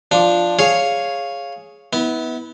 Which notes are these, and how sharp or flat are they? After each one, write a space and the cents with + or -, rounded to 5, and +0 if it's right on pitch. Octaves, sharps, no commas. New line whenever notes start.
F3 +0 D4 +0
G#4 +0 C#5 +0 F5 +0
B3 +0 E4 -35